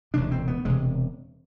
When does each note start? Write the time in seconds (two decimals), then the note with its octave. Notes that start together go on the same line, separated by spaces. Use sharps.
0.14 E1 D2 C3 D4
0.31 C4
0.48 B3
0.65 E1 C3 G#3